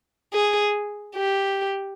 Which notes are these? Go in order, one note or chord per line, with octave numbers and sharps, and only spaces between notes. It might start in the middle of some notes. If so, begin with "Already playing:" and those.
G#4
G4